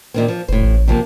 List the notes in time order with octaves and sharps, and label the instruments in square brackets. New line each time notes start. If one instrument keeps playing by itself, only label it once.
[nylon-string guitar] A#2 D#3 C4
F3
[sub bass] F1 [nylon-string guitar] A2 C5
[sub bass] A1
[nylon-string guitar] C3 F3 A#3